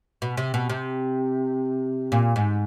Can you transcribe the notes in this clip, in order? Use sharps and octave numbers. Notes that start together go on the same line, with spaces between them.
B2
C3
B2
C3
A#2
G#2